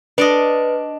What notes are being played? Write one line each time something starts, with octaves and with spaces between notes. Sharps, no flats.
D4 B4 D5 D#5